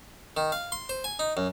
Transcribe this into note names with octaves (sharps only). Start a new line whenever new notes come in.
D#3
F5
C6
C5
G#5
D#4
F#2